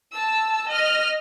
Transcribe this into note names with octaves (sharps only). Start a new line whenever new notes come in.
A5 E6
D#5 F6